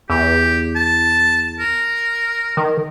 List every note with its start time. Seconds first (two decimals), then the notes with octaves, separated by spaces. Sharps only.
0.10 E2 G4
0.76 A5
1.60 A#4
2.57 D#3